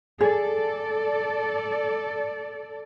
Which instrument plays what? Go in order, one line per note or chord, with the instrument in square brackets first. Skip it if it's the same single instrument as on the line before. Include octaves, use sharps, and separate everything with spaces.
[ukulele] G#4 [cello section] A4 D5